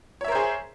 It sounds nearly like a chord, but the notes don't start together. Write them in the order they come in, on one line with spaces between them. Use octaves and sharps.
C#5 E5 A#4 C5 G#4